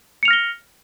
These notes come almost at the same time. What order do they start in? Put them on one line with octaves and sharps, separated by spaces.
C#7 F7 F6 A#6 G7